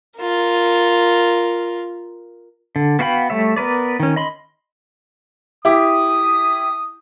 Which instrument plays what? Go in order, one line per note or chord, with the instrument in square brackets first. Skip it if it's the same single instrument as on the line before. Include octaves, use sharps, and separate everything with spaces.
[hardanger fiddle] F4 A#4
[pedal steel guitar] D3
B3 F#4 F5 G5 B5
G3 A3 C#5 E5
B3 A#4 B4 D5
D#3 C#4
D#5 B5 C6
[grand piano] E4 G4 D6 [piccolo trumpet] D#6